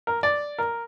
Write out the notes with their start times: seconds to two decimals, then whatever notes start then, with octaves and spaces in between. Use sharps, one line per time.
0.07 A#4
0.23 D5
0.58 A#4